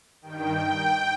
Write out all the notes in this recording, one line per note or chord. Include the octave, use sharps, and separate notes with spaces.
G2 D#3 G5